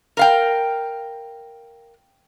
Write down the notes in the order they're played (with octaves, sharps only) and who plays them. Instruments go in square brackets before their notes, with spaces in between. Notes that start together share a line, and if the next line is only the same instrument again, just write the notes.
[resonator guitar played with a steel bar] A#4 F5 G5